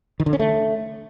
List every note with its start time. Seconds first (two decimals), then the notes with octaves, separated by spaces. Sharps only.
0.20 D#3
0.26 D3
0.33 C#4
0.39 A3